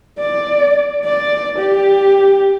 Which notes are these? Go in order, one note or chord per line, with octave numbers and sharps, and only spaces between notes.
D5
D5
G4